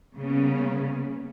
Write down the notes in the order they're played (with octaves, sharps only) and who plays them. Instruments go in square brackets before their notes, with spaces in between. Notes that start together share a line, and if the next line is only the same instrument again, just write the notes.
[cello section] C#3 G3 A#3 B3 C#4